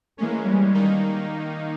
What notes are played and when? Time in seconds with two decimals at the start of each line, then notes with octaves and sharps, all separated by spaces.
0.18 E3 G#3 A#3 C#4
0.46 G3
0.74 D#3 A#3 D#4